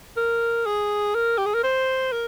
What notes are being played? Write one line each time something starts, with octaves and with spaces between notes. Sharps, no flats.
A#4
G#4
A#4
G4
G#4
A#4
C5
A#4